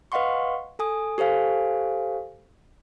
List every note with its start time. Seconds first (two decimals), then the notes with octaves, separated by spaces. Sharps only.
0.12 B4 D#5 F5 F#5 C6 C#6
0.79 A4 G#5 D#6
1.18 G4 A4 C5 F5 G#5